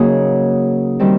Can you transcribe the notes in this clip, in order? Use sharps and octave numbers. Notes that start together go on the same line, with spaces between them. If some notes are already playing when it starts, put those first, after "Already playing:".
Already playing: C#3 F#3 A#3 D#4 G#4
D#3 G3 C4